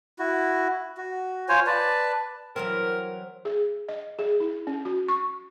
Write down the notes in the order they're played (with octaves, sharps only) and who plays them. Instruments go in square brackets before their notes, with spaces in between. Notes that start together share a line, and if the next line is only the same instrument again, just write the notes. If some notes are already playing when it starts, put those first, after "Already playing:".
[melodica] E4 F#4
F#4
F4 C5 C#5 G#5
B4 D5 A5
[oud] E3 F#3 C4 [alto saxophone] A#4
[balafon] G#4
D#5
G#4
E4
C#4
F#4
C#6